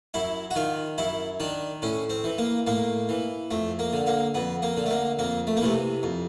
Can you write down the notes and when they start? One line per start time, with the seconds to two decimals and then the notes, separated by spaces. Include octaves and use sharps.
0.14 F#2 E4
0.51 F#4
0.55 D#3 F4
0.98 F#2 E4
1.40 D#3 D4
1.82 A2 C#4
2.10 C4
2.24 E3
2.38 A#3
2.67 A2 A#3
3.09 E3
3.51 F2 A3
3.79 A#3
3.93 D3
4.06 A#3
4.35 F2 B3
4.62 A#3
4.77 D3
4.86 A3
4.90 A#3
5.19 F2 A#3
5.47 A3
5.57 A#3
5.61 C3 E3 A3
6.03 F2